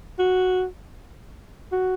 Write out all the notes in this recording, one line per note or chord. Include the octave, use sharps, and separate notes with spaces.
F#4
F#4